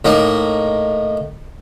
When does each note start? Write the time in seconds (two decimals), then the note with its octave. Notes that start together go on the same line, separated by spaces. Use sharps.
0.05 A2 A#3 D#4